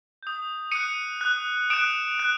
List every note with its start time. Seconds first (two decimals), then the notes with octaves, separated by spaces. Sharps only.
0.23 D#6 G6
0.71 D#6 F#6 C#7 D#7
1.21 D#6 F#6
1.70 D#6 F#6 D7 E7
2.19 F#6